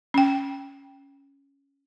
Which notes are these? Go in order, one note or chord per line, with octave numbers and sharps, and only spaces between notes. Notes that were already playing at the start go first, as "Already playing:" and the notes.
C#4 G5